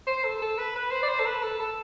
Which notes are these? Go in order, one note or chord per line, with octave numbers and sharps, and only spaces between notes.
C5
A4
A4
B4
B4
C5
D5
C5
A4
B4
A4
A4